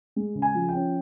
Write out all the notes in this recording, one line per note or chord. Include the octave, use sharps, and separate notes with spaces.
G#3
C#3
G#5
F3
G5
C#4